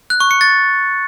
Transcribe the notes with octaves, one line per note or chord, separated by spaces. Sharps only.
F#6
C#6
C#7
A6